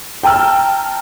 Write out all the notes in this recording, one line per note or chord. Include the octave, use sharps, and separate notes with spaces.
G5 A5 A#5 E6 F6